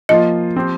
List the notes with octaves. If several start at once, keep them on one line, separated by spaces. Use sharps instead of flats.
F3 A#3 F4 D#5
F3 C4 G4